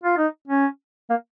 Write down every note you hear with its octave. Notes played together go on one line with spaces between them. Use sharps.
F4
D#4
C#4
A#3